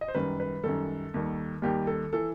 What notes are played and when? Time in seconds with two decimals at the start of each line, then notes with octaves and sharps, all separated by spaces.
0.01 D#5
0.08 C5
0.15 F#2 D#3 G3 B4
0.40 B4
0.64 F#2 D#3 G3 A4
1.14 D#2 D#3 G3
1.62 D#2 D#3 G3 G4
1.87 A4
2.13 E3 A4